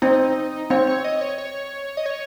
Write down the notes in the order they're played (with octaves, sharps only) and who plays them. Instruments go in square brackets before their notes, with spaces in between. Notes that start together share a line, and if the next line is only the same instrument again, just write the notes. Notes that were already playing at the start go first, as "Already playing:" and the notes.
[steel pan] C4 [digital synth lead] D#4
[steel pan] C4 [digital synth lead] C#5
[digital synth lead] C#5
D#5
C#5
C#5
D#5
C#5